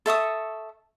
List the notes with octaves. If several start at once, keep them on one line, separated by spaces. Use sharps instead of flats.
A4 E5 C#6 D#6